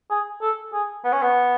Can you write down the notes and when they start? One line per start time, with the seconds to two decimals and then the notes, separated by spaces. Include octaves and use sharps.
0.10 G#4
0.41 A4
0.73 G#4
1.04 B3
1.13 C#4
1.22 B3